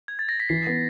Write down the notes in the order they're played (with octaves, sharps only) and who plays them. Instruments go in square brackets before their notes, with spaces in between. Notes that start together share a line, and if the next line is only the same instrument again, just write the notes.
[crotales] G#6
A6
A#6
B6
[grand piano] E3 [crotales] C7
[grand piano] B3